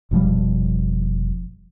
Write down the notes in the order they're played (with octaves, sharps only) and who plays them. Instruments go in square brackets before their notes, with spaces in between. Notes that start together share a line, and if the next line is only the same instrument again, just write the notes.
[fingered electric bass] F1 B2 F3 G3